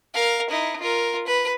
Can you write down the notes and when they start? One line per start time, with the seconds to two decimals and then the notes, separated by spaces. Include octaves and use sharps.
0.14 A#4 F5
0.50 D#4 E4
0.81 F4 A#4
1.27 B4